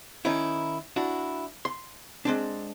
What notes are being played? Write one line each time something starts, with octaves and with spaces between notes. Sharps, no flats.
D#3 C#4 D#4 E4
D4 E4 F#4
C6
G#3 C4 D4